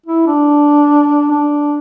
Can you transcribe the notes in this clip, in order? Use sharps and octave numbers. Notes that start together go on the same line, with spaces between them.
E4
D4
D4